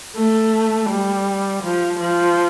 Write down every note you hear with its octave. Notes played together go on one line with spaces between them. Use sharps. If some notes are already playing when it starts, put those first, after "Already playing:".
A3
G3
F3
F3